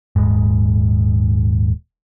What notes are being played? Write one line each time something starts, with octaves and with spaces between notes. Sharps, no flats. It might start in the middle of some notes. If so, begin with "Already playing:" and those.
D#1 G#2